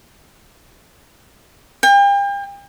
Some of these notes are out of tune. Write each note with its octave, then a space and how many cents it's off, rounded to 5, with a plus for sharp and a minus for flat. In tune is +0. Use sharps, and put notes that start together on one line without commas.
G5 +40